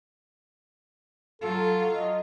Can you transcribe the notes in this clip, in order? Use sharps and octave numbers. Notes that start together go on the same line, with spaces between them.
F#3 F4 A4
D#5